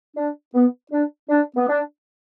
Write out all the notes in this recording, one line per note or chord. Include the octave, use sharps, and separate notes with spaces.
D4
B3
D4
D4
B3
D4